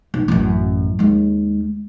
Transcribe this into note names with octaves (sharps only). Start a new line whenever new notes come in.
B1
A1 F#2
D#2 G#3